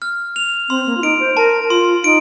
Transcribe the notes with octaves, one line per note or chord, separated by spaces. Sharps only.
F6
F7
C4 C6
A#3
F4
D#4 D7
C5
A#4 A5
F4 C6
D#4 D7